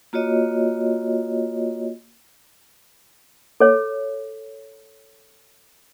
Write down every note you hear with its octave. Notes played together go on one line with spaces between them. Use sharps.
A#3 F4 F#4 C#5 D#5
A4 C#5